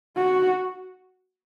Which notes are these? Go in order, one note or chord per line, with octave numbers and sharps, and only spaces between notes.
F#4